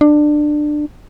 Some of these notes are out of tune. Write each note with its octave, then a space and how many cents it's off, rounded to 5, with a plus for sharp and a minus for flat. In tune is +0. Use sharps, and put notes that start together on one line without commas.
D4 +20